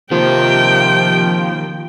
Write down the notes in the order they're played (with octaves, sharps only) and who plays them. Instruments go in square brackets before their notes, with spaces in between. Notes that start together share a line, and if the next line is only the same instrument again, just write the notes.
[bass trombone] C3 [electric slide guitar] D#3 A#3 [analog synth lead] F3 [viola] G5